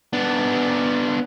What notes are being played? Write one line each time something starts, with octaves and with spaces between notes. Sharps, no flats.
B3 D4